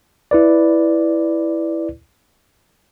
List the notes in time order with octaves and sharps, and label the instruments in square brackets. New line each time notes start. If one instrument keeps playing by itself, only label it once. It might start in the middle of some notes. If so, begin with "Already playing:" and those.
[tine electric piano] E4 B4 D5